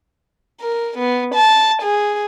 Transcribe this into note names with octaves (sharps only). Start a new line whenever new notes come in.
A#4
B3
A5
G#4